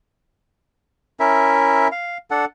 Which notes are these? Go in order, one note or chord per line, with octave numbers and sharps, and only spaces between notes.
C#4 E4 A#4 E5
F5
D4 A4 F#5